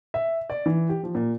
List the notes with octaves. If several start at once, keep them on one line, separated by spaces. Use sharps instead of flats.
E5
D5
E3
G4
F3
A#2